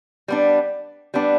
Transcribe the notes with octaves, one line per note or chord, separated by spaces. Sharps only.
G3 B3 D4
G3 B3 D4